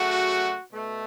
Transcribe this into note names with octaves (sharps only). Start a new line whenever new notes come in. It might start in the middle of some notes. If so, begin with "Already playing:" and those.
Already playing: C#3 F#3 A3 F#4
B2 A3